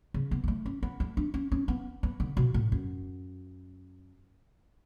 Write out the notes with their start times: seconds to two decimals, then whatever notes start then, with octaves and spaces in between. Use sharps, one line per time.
0.14 C#3
0.31 B3
0.44 G#3
0.48 A3
0.66 C#4
0.83 B3
1.00 A3
1.17 D4
1.34 C#4
1.52 C#4
1.68 B3
2.03 B3
2.20 D3
2.37 B2
2.54 A2
2.72 F#2